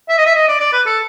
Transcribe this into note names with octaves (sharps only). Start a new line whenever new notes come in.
E5
D#5
E5
D#5
D5
D5
B4
A4